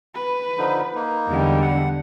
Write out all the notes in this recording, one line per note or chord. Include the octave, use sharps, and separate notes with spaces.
B4
D3 F3 D#4
A#3 D#4
E2 D3 G3 G#3
F#5